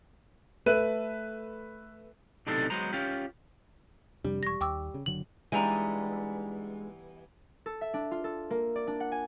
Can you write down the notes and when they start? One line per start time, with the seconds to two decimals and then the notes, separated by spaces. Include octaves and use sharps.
0.66 A3 A4 B4 E5 F#6 D#7
2.47 B1 A2 C3 D4 D#4 A4
2.70 F#3 G#3 B3 C5 A#5
2.93 C#4 F4 G4
4.25 F2 C3 G3 D4
4.43 E1 C#6 A#6
4.61 D#2 G5 D6 E6
4.94 C#3
5.06 F#1 D3 F#3 F#7
5.52 E3 G3 G#3 B3 D4 D#4 G#5 A#5
7.66 A4
7.81 E5
7.94 D4
8.11 F4
8.24 A4
8.50 A#3
8.76 D5
8.87 D4
9.00 F#5
9.12 G#5